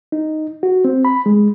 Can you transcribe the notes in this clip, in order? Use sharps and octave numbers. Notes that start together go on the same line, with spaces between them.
D#4
F#4
C4
B5
G#3